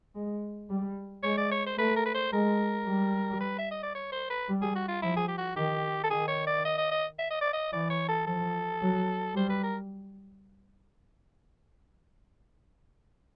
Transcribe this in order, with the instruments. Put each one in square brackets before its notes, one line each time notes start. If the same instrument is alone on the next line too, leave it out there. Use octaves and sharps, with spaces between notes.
[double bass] G#3
G3
[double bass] G#3 [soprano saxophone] C#5
[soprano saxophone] D5
C#5
C5
[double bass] A3 [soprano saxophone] B4
[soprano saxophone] A#4
B4
C5
[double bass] G#3 [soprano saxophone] A#4
[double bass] G3
[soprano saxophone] B4
E5
D#5
D5
C#5
C5
B4
[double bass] G3
[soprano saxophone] G#4
F#4
F4
[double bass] F3 [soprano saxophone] E4
[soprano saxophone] G#4
G4
F#4
[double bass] D#3 [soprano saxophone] G4
[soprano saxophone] A4
[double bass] D#3 [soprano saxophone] G#4
[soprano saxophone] C#5
D5
D#5
D#5
D#5
E5
D#5
D5
D#5
[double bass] E3 [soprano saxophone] D5
[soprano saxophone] C#5
A4
[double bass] F3 [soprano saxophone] A4
[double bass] F#3
[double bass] G3 [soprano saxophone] C5
[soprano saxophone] B4
A#4